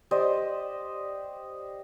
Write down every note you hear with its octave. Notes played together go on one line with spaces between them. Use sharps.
G4 C5 D5 D#5